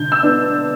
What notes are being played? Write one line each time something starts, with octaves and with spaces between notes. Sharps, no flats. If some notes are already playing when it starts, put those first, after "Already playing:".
Already playing: D3 G6
E6
B3 D4